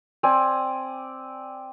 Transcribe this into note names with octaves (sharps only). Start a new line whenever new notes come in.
C4 D5 G#5